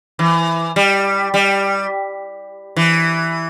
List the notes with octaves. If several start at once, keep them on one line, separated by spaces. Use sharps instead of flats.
E3
G3
G3
E3